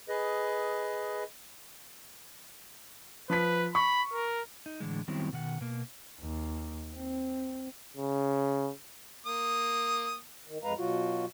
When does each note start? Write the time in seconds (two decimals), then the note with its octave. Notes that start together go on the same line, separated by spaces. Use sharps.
0.09 G#4 B4 D#5
3.30 F3 B4 B6
3.75 B5 C#6
4.12 A#4
4.66 D#4
4.80 A2 D3 E3 G#3
5.08 D#3 F#3 G3 B3 C4 E4
5.33 B2 D#3 F#5
5.61 B2 A#3
6.20 D#2
6.94 C4
7.97 C#3
9.26 A#3 D#6
10.48 D#3
10.64 F2 G#3 B4 F5 A#5
10.78 B2 F#3 F4 F#4